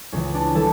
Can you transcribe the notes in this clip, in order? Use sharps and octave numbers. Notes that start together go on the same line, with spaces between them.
C#2 C#3 E3 C#4
D4
E3 G3 A4